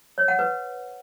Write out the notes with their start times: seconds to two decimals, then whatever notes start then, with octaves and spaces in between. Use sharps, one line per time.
0.18 C#5
0.28 F#5
0.39 B4